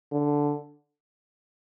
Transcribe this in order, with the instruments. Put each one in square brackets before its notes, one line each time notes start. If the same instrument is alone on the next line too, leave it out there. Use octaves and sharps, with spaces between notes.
[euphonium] D3